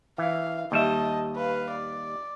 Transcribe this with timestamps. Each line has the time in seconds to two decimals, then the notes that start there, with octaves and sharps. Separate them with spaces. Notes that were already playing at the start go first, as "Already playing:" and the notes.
0.18 E3 F5
0.72 D#2 G3 D#5 E5 A5
1.36 B4 F5
1.71 D5